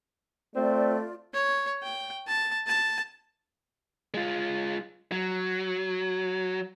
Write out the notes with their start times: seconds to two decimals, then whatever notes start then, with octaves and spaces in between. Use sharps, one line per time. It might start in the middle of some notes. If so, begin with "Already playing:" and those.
0.55 A3 C4 F4 D5
1.33 C#5
1.83 G5
2.27 A5
2.67 A5
4.14 G#3 F4
5.12 F#3